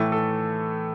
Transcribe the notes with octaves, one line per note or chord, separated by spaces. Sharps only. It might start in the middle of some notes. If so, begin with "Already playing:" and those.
Already playing: A2 E3 A3 A4
A4